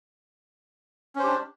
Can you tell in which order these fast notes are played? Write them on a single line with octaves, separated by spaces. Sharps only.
C#4 C5 G4 D4